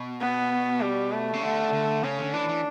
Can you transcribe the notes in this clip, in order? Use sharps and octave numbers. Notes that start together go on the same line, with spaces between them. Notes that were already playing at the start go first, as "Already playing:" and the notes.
Already playing: B2
B3
G3
A3
C#3
D3 A3
D3
C#3 C#4
D3
E3 D4
E3